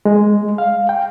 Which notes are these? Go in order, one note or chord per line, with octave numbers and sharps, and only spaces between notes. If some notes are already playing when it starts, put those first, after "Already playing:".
G#3
F5
G5